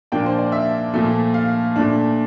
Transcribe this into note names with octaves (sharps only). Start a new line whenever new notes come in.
A#2 F3 A#3 D4 G5
C5
D5
E5
A#2 F3 A3
F5
A#2 A3 D4